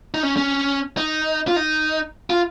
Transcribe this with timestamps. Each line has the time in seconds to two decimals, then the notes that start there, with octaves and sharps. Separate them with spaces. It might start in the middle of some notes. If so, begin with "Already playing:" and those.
0.14 D#4
0.23 C#4
0.37 C#4
0.97 D#4
1.48 F4
1.56 D#4
2.30 F4